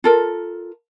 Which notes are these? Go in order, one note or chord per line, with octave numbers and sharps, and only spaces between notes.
F4 A4 A#4